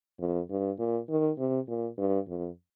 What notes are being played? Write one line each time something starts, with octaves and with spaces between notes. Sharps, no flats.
F2
G2
A#2
D#3
C3
A#2
G2
F2